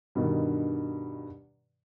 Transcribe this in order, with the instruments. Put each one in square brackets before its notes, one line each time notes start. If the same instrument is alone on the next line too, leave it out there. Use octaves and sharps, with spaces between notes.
[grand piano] G2 B2 D3 D#3